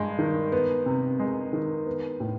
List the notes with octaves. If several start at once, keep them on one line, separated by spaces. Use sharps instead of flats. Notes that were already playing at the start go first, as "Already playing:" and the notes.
Already playing: G2 G#3
D#3
B3
C3
G#3
D#3
B3
A2